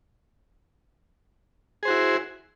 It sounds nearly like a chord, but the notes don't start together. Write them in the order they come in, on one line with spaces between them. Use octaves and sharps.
G#4 C5 F#4 E4